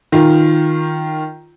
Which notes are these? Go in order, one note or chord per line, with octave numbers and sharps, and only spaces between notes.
D#3 F4